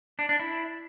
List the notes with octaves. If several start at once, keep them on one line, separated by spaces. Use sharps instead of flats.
D4
D4
E4